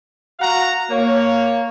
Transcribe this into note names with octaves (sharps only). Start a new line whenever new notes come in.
F#4 F5 F#5 A#5
A#3 C#5